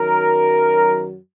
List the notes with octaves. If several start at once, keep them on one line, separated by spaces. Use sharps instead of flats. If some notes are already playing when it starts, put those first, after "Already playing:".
Already playing: F#2 D#3 F#3 A#4